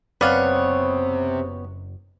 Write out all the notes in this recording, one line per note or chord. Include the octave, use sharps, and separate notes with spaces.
F#1 F#2 C3 B3 B4 C#5 D5 F5